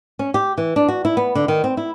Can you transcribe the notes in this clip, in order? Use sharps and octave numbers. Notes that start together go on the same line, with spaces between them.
C#4
G4
E3
D4
F#4
E4
B3
D3
D#3
C4
E4